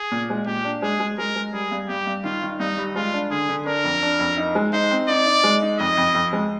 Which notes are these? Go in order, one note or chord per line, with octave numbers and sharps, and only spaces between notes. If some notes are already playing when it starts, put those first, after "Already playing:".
Already playing: G#4
A#2
G#3
A#2 G4
D4
G#3 G#4
G#3
G#3 A#4
G#3
G3 G#4
G2
G2 G4
G2
D#3 F4
D#3
G2 D#4
G3
G#3 F4
D4
D3 G#4
D3
D4 A#4
F2
D4
F2
D#4
G#3
D#4 C5
C4
D#4 D5
D#4
G#3
D#4
F2 D#5
F2
F2
G#3